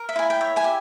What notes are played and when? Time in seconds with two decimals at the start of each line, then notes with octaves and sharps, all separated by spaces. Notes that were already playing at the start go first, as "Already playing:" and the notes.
Already playing: A#4
0.09 E5
0.16 E4 G#5
0.30 G5
0.41 C#5 E5
0.56 E5 G#5
0.64 G4